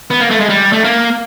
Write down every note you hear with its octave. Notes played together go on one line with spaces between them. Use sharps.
B3
A#3
A3
G#3
G3
A3
A#3